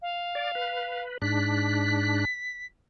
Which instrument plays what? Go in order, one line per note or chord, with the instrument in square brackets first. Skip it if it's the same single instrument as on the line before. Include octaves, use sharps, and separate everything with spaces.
[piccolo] F5
[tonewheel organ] D5
B4
[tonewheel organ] G#2 D4 F#6 [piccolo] B6